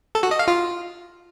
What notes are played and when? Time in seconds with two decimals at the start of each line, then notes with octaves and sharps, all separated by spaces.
0.15 A4
0.23 F#4
0.31 D#5
0.39 F5
0.48 F4